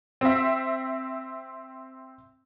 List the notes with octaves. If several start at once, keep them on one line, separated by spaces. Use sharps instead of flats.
C4 E5